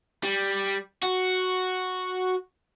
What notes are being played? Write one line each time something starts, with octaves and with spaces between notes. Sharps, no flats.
G3
F#4